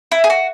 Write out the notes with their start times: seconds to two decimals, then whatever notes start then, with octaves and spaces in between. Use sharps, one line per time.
0.12 E4
0.24 G#4
0.30 F#4